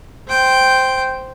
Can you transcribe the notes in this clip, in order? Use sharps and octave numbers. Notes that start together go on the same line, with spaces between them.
C5 G5